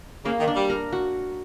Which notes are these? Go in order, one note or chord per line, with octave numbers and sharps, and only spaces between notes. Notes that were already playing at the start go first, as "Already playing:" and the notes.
C#3 A#3
D#3
D4
G3
A#4
F#4